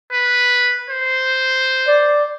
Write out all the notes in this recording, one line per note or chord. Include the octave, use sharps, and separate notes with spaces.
B4
C5
D5